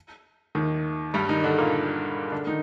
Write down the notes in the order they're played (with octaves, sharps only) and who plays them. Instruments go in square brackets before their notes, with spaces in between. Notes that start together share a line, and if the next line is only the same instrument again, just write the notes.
[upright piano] D#2 D#3
G2 G3
D#3 D#4
D3 D4
A#2 A#3
D3 D4
D#3 D#4